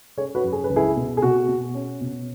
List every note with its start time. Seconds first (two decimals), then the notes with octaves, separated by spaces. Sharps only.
0.18 C#4 G#4 C#5
0.35 F#4 B4
0.44 F#2
0.52 G#4
0.64 B4
0.69 C#2
0.76 E4 G#4
0.97 B2
1.17 G#4
1.22 B2 F#4
1.48 B2
1.75 C#4
2.01 B2